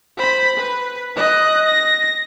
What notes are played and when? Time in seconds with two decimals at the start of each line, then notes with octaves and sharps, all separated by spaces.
0.17 C5 B5
0.57 B4
1.16 D#5 F#6
1.66 A#6